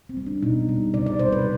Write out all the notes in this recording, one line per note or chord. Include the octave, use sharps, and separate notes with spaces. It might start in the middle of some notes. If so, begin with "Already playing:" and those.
C4
G3
D4
B2 D#4
G3
C3 D5
D5
G3 C5
B4